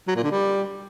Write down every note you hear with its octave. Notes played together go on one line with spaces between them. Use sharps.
F#3
A#2
D3
G3